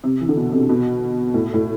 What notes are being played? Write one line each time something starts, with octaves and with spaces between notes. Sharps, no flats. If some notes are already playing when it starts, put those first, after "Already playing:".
C3
E3
D3
B2
C3
B2
A2
A2